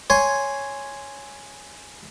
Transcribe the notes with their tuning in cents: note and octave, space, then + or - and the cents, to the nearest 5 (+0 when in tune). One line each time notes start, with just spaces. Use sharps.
C#5 +0 G#5 +0 C6 +0